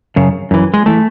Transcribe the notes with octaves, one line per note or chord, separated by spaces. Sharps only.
F#2 C#3
F#2 E3
G#3
E3 A3